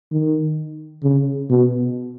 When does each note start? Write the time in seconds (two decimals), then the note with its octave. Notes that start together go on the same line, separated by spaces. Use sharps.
0.12 D#3
1.03 C#3
1.50 B2